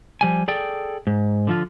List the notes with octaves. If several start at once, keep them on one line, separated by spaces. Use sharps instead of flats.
F3 G3 G#5
G#4 A4 D5 G5
G#2
D3 F3 F4